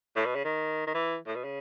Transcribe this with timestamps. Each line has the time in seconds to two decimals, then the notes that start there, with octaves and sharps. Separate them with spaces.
0.16 A2
0.25 B2
0.35 C#3
0.44 D#3
0.87 D#3
0.94 E3
1.26 A2
1.35 B2
1.44 C#3